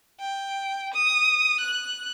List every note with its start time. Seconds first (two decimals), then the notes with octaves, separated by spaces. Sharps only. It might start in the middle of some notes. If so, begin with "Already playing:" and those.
0.20 G5
0.94 D#6
1.60 F#6